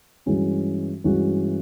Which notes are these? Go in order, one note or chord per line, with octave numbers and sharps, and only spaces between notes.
G2 E3 G#3 C#4 F#4
G2 E3 G#3 C#4 F#4